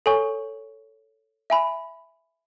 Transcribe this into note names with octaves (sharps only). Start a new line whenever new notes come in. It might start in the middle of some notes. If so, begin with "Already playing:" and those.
A4 C#5 G#5 C#6
E5 G#5 B5